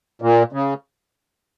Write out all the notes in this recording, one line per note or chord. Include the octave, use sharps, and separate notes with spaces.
A#2
C#3